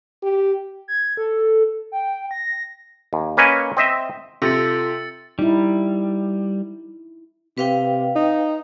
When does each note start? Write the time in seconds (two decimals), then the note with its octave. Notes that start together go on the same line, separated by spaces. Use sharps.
0.23 G4
0.88 G#6
1.17 A4
1.92 G5
2.31 A#6
3.13 D#2
3.37 A#3 C#4 B4 C#5 D#5 G#5
3.77 C4 D#5 E5
4.42 C3 F4 A4 E6 A6 A#6 C#7
5.39 G3 D#4 E4
7.58 C3 B4 F5 G5
8.16 D#4